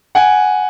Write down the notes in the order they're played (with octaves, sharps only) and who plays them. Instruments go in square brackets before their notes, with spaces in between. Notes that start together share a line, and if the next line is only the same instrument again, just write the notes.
[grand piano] F#5 G#5